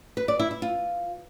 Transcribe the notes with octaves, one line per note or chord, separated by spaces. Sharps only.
B4
D5
E4
E4
F4